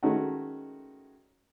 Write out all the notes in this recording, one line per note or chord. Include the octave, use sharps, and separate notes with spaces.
D#3 G#3 A3 C#4 F#4